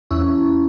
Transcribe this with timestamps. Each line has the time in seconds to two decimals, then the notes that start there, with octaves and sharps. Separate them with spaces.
0.11 E2 C#4 E4